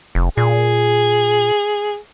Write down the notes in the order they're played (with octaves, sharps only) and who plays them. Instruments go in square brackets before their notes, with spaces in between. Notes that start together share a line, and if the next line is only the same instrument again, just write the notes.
[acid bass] F1
[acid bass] A#2 [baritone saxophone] G#4